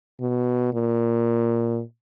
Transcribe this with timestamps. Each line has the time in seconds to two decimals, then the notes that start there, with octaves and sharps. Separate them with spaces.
0.21 B2
0.73 A#2